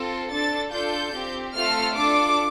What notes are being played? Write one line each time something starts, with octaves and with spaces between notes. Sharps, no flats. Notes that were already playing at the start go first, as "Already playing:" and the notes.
Already playing: C4 F4 A4
D4 A4 A6
D4 F4 A4 G6
C4 G4
A3 C4 F4 A4 F6
D4 F4 A4 D6